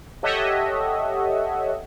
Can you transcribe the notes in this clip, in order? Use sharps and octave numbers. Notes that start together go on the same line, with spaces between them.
G4 A4 C#5 D#5 E5 F#5